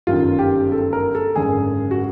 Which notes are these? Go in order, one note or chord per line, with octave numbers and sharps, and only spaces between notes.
G1 F#2 D#3 F4
G4
A4
A#4
A4
G#1 F#2 D3 G#4
F#4